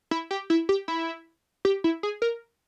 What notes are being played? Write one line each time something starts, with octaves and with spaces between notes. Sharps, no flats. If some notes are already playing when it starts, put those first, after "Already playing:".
E4
G4
E4
G4
E4
G4
E4
G#4
A#4